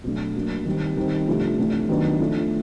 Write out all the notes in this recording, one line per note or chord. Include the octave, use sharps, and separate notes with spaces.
B2 F#3 A3 D4
F#3 A#3 D4
D#3 G3 C4
D#3 G3 C4
C3 F3 A3 D4
C3 E3 A3 D4
D#3 F#3 B3 D4
F3 A3 D4